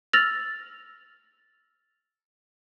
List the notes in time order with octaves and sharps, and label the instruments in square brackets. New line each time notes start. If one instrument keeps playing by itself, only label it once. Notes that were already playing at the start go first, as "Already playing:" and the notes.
[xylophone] E6 F6 A6 A#6 F7 F#7